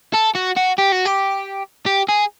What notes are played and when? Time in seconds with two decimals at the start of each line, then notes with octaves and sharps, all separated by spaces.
0.14 A4
0.35 F#4
0.57 F#4
0.79 G4
0.92 F#4
1.06 G4
1.86 G4
2.08 G#4